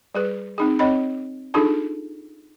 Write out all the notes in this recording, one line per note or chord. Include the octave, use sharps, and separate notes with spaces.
G3 G#4 B4
C4 D#4 G#4
C4 C#5 D#5 B5
D4 D#4 F4 G#4 A4